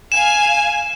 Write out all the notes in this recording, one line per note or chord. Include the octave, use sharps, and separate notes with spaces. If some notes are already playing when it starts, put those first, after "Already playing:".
F5 G#5 E7